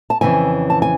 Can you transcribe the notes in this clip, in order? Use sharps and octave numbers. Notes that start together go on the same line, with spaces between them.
A5
F2 C#3 E3 G#5
A5
G#5